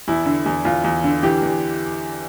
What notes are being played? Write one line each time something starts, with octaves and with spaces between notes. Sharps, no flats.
E2 E4
D3
E2
E2 F4
E2
D3
E3 G4
E2